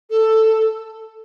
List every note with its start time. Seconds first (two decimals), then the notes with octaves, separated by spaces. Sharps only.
0.10 A4